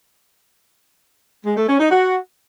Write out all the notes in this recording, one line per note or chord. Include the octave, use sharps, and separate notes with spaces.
G#3
A3
C#4
D#4
F#4